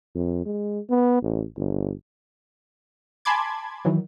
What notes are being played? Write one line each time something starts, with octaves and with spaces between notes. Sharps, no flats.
F2
G#3
B3
A1
G1
G#5 A5 B5 C6 D6 G#6
D#3 E3 F#3